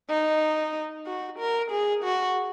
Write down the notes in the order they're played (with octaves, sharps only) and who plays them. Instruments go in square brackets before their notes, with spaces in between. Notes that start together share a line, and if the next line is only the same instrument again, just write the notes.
[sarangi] D#4
F#4
A#4
G#4
F#4